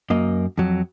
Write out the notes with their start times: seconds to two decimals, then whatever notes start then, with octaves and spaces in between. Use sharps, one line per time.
0.10 F#2 A#3 D#5
0.58 F2 F#3